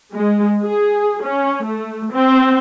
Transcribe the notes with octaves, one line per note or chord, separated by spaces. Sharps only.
G#3
G#4
C#4
A3
C4